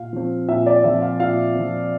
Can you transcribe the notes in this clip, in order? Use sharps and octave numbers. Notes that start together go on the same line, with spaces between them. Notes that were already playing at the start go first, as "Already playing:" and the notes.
Already playing: A#2 F5
F3 C4
A#2 E5
D5
F3 C4 E5
F5
A#2 F5
F3 C4